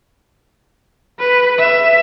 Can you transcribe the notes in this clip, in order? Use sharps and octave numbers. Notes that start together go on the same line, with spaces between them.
B4
E5